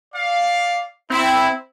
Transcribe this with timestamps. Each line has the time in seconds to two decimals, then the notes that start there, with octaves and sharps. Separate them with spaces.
0.14 D5 F5
1.10 C4 E4